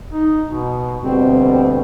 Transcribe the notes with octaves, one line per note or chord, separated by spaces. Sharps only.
D#4
B2
D2 B2 G3 C4